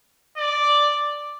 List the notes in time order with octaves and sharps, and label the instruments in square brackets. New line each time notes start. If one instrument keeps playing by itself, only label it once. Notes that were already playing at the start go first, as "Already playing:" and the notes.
[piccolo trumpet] D5